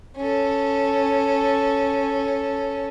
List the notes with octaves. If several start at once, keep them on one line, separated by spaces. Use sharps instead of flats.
C#4 A4